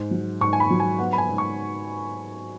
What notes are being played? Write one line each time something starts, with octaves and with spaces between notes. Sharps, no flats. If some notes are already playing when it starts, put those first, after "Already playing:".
Already playing: G#2
F#3
G#2 C#6
G#5
B5
F#3
G#5
B3 F#5
B5
G#5
G#2
C#6